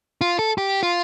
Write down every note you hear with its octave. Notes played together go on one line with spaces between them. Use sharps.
F4
A4
G4
F4